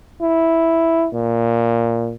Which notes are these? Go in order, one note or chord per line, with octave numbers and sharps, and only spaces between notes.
E4
A#2